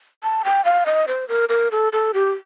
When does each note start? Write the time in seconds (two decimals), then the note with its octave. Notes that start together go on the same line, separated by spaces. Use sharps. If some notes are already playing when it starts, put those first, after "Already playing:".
0.23 A5
0.45 G5
0.65 F5
0.86 D#5
1.08 C5
1.29 A#4
1.49 A#4
1.72 A4
1.93 A4
2.14 G4